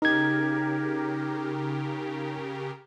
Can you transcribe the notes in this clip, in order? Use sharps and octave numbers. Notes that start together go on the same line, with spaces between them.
C#3 D#4 G4 A#4 G#6